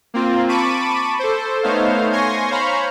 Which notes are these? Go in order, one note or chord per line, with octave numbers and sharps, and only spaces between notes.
A#3 C4 F4
A5 B5 C#6 D6 D#7
A4 C5
A3 B3 D#4 C5 C#5 F5
G#5 C6 C#6 A#6
C5 C#5 F5 A#5 B5 C#6